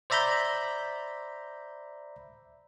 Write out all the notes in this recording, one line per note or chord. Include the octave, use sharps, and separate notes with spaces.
C5 D5 E5 A#5 B5 G6